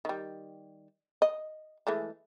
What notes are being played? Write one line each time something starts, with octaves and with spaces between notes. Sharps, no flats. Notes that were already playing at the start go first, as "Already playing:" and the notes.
D#3 G3
D#5
E3 G#3 A3